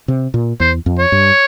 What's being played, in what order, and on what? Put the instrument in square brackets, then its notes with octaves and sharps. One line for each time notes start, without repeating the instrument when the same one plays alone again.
[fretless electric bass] C3
A#2
[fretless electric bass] E2 [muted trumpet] C5
[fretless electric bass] F2
[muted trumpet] C#5
[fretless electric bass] G2